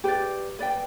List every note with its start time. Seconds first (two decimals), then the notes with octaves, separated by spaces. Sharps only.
0.04 G4 B4 D5
0.59 B4 D5 G5